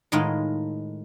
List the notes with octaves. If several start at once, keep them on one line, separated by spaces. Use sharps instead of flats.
A2 D#3 G#3 D#4 F4